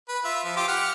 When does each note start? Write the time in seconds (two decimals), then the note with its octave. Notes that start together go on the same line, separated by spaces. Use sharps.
0.09 B4
0.24 F4 E5
0.44 F3
0.56 F4 G4 D6
0.68 G4 F#5 F6